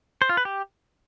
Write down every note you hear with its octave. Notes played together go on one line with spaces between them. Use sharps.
C5
F4
B4
G4